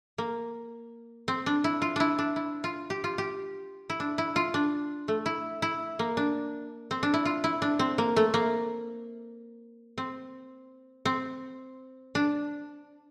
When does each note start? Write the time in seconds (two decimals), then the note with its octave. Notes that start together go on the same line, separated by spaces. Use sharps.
0.18 A#3
1.28 C4
1.46 D4
1.64 E4
1.82 F4
1.96 D4 E4
2.19 D4
2.36 E4
2.64 F4
2.90 G4
3.04 F4
3.18 G4
3.90 E4
4.00 D4
4.18 E4
4.36 F4
4.54 D4
5.08 A3
5.26 E4
5.62 E4
5.99 A#3
6.17 D4
6.91 C4
7.03 D4
7.14 E4
7.25 F4
7.44 E4
7.62 D4
7.79 C4
7.98 A#3
8.16 A3
8.34 A#3
9.98 C4
11.05 C4
12.15 D4